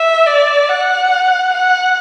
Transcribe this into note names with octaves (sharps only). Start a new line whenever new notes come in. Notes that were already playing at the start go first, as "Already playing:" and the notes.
Already playing: E5
D5
F#5
F#5